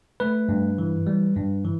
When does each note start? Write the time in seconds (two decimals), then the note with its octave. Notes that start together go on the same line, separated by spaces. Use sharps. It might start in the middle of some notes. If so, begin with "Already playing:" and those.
0.20 A3 B4
0.49 G2
0.78 E3
1.07 G3
1.36 G2
1.65 E3